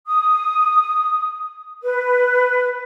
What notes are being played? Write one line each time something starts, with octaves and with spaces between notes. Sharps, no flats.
D#6
B4